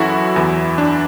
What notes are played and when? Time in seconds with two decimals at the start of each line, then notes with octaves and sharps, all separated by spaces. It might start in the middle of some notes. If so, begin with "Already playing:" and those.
Already playing: F#2 E3 E4 F#4 A4
0.36 E2 E3
0.78 D4